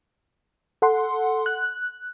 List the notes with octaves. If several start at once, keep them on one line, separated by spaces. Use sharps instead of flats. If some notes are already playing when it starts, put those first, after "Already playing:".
A4 F#5 C6
F#6